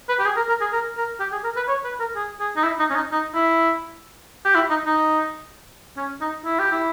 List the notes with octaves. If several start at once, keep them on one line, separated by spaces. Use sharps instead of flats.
B4
G4
G#4
A#4
A#4
G#4
A#4
A#4
G4
G#4
A#4
B4
C#5
B4
A#4
G#4
G#4
D#4
E4
D#4
C#4
D#4
D#4
E4
G4
E4
D#4
D#4
C#4
D#4
E4
G4
E4